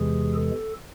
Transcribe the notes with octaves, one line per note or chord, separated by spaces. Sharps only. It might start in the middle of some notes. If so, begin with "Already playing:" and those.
Already playing: E2 C3 E3 G#3 G#4
A4